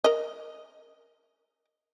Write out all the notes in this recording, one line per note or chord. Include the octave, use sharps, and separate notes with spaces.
A#4 D#5